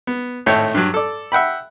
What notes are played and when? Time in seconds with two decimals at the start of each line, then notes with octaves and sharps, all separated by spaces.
0.07 B3
0.46 G#1 A2 A3 C#5 G5
0.74 G2 F#3
0.94 A4 D5
1.32 E5 F#5 G5 B5